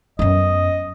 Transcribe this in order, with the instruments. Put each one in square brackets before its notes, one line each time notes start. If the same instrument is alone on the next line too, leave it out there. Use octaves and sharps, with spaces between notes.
[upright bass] F#2 B3 [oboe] D#5